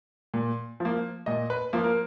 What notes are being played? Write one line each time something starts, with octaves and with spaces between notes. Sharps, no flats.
A#2
F3 A#3
A#2 D#5
B4
F3 A#3
A#4